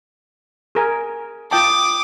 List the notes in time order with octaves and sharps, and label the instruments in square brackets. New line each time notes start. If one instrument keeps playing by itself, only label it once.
[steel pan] G#4 A#4 G#5
[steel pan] F4 G5 A5 [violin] D6 D#6